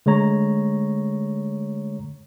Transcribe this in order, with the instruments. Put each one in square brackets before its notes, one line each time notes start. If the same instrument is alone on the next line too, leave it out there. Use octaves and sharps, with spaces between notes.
[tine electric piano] D3 G#3 A3 C#5 A#5